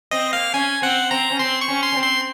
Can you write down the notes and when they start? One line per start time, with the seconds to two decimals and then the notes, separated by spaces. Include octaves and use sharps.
0.11 C4 D#5
0.33 A#3 F5
0.53 C#4 G#5
0.82 C4 F#5
1.11 C4 A#5
1.31 C#4
1.39 C4 C6
1.61 C#6
1.68 C#4
1.83 C6
1.92 C#4
1.96 C4
2.03 C6